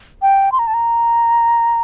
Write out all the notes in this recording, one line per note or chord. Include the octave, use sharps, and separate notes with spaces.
G5
C6
A#5
A5
A#5